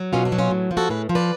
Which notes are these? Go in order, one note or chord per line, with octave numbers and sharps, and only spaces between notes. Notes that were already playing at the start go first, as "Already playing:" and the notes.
Already playing: F#3
B2 C#4 F4
B3 D4
F#3
C#4 F4
A2
F3
F#4 A4
A2 G#4 B4
F3
B4 D5